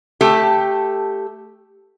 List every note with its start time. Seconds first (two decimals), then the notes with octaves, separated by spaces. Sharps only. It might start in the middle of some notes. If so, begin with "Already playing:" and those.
0.21 A3 G4 A4